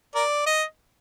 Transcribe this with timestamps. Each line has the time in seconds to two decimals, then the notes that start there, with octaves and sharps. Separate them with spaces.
0.15 A#4 D5
0.46 D#5